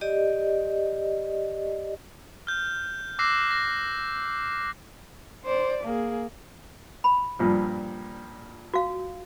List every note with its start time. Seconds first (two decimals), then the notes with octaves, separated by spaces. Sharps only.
0.01 G4 D5 D#5
2.47 F6 G6
3.19 D6 E6 F#6 A#6 C7 E7
3.51 A#6
5.45 C5 D5
5.84 A#3 G#4
7.04 B5
7.39 G2 A#2 F3
8.74 F#4 F5